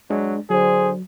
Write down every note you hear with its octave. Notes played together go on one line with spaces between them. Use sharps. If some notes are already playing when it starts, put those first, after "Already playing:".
F#3 G#3 D4
D3 F#3 G#4 C5